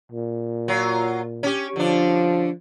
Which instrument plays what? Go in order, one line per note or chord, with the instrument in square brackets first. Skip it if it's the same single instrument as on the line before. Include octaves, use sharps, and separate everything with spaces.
[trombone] A#2
[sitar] F#3 F4
C#4 G4
[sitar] D3 D4 [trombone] F3